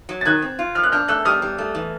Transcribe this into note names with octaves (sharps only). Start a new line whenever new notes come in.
F#3
A6
D#3 F#6 G#6
C4
F4
F3 F6
F#6
D4 F6 G6
A3 E6 F#6
G3 D#6 F6
G3
A3
E3